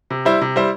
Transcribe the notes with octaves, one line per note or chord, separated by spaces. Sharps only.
C3
G3 E4 C5
C3
G3 E4 C5